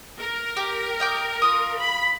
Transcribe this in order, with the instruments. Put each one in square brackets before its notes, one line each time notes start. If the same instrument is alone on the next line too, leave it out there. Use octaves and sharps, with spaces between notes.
[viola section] A#4
[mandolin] G4
D#5 G5 D6
F4 D#6
[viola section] B5